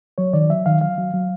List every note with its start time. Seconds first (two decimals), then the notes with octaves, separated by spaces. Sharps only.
0.18 F#3 C#5
0.33 D#3 D5
0.49 F#3 E5
0.66 D#3 F5
0.81 F#3 F5
0.98 F#3
1.14 F#3